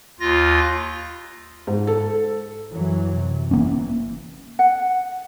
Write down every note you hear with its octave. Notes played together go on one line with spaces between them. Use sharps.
D#2 F4 A#6
G#2
A4
F#2 E3 F#3
C3
G1 E3 A#3 C#4
F#5